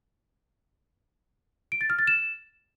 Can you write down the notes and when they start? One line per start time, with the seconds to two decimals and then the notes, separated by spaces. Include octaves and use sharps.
1.72 D7
1.81 A6
1.90 F6
1.99 A6
2.07 E7